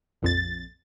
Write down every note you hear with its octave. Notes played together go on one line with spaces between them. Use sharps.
A#1 F2 A6